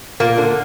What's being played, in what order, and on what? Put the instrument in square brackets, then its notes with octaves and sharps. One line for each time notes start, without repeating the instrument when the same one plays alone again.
[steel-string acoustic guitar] A#2 [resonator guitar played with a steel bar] A#3
[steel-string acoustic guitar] D3